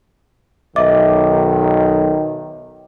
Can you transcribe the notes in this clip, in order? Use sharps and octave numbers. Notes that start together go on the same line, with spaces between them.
B1 D#3 D#5 E5 D6